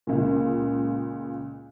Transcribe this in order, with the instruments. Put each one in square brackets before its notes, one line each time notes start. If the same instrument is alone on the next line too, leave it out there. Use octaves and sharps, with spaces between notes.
[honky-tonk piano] C#2 A#2